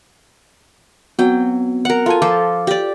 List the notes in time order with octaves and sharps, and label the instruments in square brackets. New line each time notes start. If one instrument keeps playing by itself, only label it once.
[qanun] F#3 G5 [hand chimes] B3 C4
[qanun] A#4 F#5
[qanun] F4 G#5 [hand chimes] A4 A5
[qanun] F3 A4 C5 [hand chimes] D6
[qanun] G4 D5